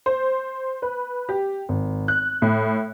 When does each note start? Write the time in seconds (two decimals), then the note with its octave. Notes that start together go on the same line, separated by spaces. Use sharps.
0.06 C5
0.82 B4
1.29 G4
1.69 G#1
2.08 F#6
2.42 A2